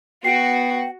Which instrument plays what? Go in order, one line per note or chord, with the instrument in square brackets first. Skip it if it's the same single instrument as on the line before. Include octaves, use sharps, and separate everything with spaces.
[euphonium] B3 [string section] F#4 [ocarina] G5 [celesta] C7 D7